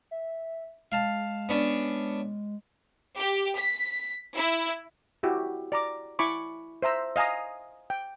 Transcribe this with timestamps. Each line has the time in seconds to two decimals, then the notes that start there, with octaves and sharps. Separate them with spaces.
0.11 E5
0.92 G#3 F5 A5
1.49 B3 C#4 D4
3.17 G4
3.57 B6
4.36 E4
5.23 E4 F#4 G4 E6
5.72 D5 A#5 D6
6.19 E4 G#5 B5 C#6 D6
6.82 C5 E5 A#5 E6
7.16 D#5 F5 G#5 A#5 D#6
7.90 G5